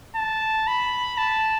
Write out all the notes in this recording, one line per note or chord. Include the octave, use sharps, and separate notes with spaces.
A5
B5
A5